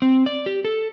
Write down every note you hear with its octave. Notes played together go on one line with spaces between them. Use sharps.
C4
D5
G4
A4